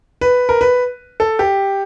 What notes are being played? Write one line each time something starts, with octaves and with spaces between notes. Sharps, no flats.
B4
A#4
B4
A4
G4